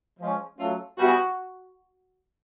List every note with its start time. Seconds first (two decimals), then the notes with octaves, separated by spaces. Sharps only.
0.20 F3 G#3 C#4
0.59 F#3 A3 C#4 F4 A4
0.98 G3 B3 E4 F#4 G#4